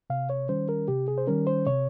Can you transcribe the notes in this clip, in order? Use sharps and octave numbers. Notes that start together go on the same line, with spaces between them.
C3 F5
C#5
D#3 G3 C#4 C5
A#4
C3 G4
G#4
C5
D#3 G3 C#4 A#4
C5
C3 C#5